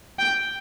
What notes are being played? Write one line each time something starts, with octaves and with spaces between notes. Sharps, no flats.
G5